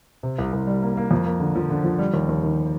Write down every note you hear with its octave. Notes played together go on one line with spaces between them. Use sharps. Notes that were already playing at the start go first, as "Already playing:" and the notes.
C3
C2
C2
G3
A#3
A#3
F2
A#3
D3
F3
D3
F3
G3
D#2
D#2
D#3